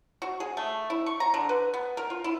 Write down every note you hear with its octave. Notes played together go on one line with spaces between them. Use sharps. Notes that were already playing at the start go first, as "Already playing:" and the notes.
F#4
G#4
A3
E4
C#6
A#5
D3
B4
B3
A#4
F4
E4